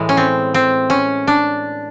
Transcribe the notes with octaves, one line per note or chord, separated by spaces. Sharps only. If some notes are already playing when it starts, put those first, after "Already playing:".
Already playing: A2 E3 G#3
C#4
C4
C4
C#4
D4